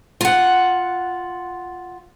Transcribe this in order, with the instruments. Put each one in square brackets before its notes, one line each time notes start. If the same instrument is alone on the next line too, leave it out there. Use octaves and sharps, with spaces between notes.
[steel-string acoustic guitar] F4 F#5